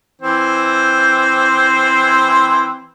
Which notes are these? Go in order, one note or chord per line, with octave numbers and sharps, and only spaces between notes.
E3 C4 C5